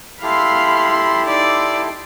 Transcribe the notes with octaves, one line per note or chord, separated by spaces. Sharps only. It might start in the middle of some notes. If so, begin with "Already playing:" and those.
E4 G4 A4 F5 B5 C6
D#4 D5 C6